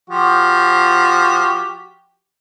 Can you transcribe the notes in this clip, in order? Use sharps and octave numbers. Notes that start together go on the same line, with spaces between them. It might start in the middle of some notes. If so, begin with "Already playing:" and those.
F3 F#4 G4